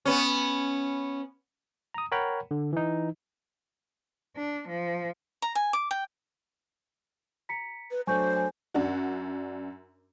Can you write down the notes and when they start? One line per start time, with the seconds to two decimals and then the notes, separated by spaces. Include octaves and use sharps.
0.05 B3 C#4
1.94 A#5 D#6
2.12 A#4 C#5 F#5 G5 A#5 B5
2.51 D3
2.73 E3 D#4
4.36 D4
4.68 F3
5.42 A#5
5.55 G#5
5.73 D6
5.91 G5
7.49 A#5 B6 C#7
7.91 B4
8.07 F#3 A3 D4 C5 G#5 C#6 G6
8.36 G#5
8.74 F#2 D4 F#4